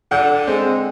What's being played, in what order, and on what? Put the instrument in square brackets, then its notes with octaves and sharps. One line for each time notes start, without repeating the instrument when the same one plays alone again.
[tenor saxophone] D3 [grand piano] F#5 G6
[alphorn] G#3 [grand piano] C4